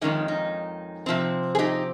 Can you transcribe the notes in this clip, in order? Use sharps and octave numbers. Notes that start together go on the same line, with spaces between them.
F2 C3 D#3 G#3 C#4 D#4
D#4
C3 F3 C4
G#4
D#4 G4